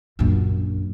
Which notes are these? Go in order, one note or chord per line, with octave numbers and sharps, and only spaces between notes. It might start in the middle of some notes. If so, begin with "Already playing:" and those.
A#1 F#2